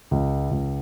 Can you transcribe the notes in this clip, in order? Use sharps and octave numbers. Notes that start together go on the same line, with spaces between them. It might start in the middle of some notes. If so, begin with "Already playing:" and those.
C#2
C#2